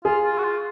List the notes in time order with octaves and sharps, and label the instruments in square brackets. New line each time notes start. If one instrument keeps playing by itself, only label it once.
[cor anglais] F4 [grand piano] G#4
[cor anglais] F4
F#4
F4